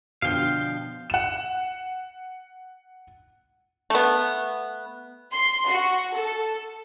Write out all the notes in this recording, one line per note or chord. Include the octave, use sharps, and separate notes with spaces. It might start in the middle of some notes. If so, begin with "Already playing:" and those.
B2 D3 F3 F5 G5
F#5 E7
A3 B3
C6
F#4
A4